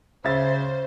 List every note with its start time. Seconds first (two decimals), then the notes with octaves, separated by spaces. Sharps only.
0.24 C#3 C5 E5 A6